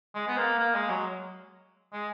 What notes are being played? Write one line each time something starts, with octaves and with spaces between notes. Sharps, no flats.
G#3
B3
A#3
A#3
G#3
F#3
G#3